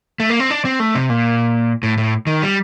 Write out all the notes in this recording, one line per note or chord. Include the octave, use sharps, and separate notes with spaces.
A3
A#3
C4
D4
C4
A3
C3
A#2
A2
A2
D#3
G3